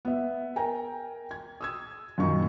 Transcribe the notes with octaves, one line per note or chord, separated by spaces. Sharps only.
B3 E5
A#4 G5 G#5 A#5
G#6
D#6 E6 G#6
F#2 A#2 D#3 D#4 C#6